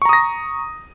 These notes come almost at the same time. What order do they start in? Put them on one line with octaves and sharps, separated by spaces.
C#6 A#5 D#6 A#6